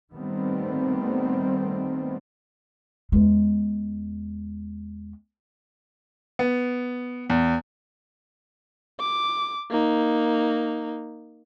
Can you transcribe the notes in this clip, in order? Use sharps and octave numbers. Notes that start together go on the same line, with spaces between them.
D#3 G3 A3 B3 C4
E2 G#3
B3
E2
D6
A#3 D#4